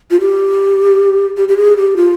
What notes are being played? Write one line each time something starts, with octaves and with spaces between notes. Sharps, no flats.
F4
G4
G4
G4
G#4
G4
F4